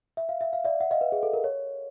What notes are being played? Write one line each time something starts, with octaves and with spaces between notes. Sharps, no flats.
E5
F5
E5
F5
D5 E5
E5 F#5
D#5 F5
B4
G#4
A4
A#4
C#5